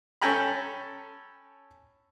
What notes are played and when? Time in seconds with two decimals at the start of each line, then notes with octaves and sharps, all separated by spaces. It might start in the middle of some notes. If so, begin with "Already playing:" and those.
0.21 C#4 A4 G5 G#5 A#5 B5